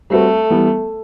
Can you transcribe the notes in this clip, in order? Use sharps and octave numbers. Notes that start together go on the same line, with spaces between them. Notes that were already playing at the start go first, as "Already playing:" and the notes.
G3 A3 C4 F#4 B4
E3 G3 B3